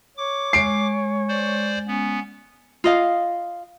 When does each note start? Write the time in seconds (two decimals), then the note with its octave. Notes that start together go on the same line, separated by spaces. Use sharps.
0.17 C#5 D6
0.53 G#3 C7 D7
1.29 C5 D5
1.87 B3 C#4
2.84 F4 D#5 F5